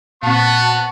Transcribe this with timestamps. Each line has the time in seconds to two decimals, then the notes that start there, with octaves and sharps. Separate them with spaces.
0.23 A#2 B3 C4 F#5 A5 C#6